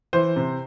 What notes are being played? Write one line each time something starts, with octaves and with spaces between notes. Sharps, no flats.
E3 C5
C3